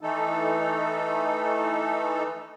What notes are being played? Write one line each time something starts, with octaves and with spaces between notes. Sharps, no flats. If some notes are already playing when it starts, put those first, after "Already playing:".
E3 A3 D#4 A4